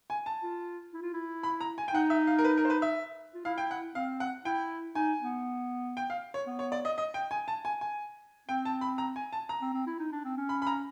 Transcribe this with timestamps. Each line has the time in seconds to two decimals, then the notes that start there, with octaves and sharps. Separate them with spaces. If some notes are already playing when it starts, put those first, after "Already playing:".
0.10 G#5
0.26 A5
0.43 F4
0.94 E4
1.03 F4
1.14 E4
1.43 B5
1.61 A#5
1.78 G#5
1.88 G5
1.94 D#4 F#5
2.10 E5
2.27 F5
2.39 A#4
2.44 B4
2.57 A#4
2.65 C5
2.70 B4
2.82 E5
3.35 F4
3.45 E4 F5
3.58 G5
3.71 F#5
3.95 C4 F5
4.20 F#5
4.45 E4 G5
4.95 D#4 G#5
5.22 B3
5.97 G5
6.10 F5
6.34 C#5
6.47 B3
6.59 C#5
6.72 D5
6.85 D#5
6.98 D#5
7.14 G5
7.31 G#5
7.48 A5
7.65 G#5
7.81 G#5
8.49 C4 G5
8.65 A5
8.81 B5
8.98 A#5
9.16 G#5
9.33 A5
9.49 A#5
9.62 C4
9.74 C4
9.87 E4
10.00 D#4
10.13 D4
10.25 C4
10.37 C#4
10.49 B5
10.62 B5
10.67 A#5